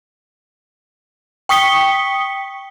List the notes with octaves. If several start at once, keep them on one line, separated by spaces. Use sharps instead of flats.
G5 C#6 D#6 B6 C#7 G7